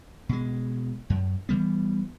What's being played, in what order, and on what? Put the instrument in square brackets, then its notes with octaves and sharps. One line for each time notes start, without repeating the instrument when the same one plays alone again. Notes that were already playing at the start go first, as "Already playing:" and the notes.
[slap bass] B2 G#3
F#2
E3 F#3 G3 B3